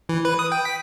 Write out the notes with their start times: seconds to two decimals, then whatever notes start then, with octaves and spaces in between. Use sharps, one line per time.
0.09 E3
0.25 B4
0.39 D#6
0.52 G5
0.65 B6